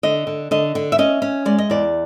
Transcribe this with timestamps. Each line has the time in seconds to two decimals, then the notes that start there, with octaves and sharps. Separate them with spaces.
0.03 D3 D#5
0.27 D3
0.51 D3 D#5
0.75 D3
0.92 E5
0.98 C#4 D#5
1.22 C#4
1.45 G#3 D5
1.58 D#5
1.70 E2 D5